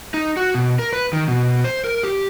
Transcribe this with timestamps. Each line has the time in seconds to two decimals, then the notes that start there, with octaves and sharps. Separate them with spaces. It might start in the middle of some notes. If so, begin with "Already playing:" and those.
0.14 D#4
0.37 F#4
0.55 B2
0.79 A#4
0.93 B4
1.13 D#3
1.28 B2
1.64 C5
1.84 A#4
2.03 G4